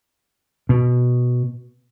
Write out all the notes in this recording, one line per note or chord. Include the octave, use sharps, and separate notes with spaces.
B2